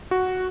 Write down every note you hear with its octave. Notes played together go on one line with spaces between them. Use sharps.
F#4